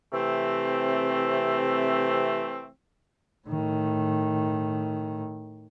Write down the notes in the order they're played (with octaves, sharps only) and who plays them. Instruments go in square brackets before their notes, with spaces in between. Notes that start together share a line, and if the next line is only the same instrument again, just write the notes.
[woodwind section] C3 E3 A3 C4
[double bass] A2 D#3